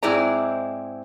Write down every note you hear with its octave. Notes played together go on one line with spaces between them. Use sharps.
G#2 C4 E4 G#4 D5 A#5